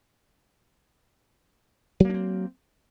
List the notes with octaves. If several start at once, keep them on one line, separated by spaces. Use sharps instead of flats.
F#3 A#3 C4 D4